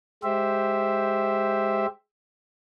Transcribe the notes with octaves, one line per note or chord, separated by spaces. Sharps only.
G#3 G4 C5 E5